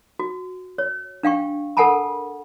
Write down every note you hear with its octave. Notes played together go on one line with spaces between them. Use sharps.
F#4
C#5
D4 F5 G5 C#6
A4 A#4 F#5 G#5 A5 B5